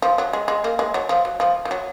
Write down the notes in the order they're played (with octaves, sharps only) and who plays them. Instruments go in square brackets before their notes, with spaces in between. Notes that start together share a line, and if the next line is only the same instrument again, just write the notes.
[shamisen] F3
F#3
G#3
G#3
A#3
G#3
F#3
F3
F#3
F3
F3
F#3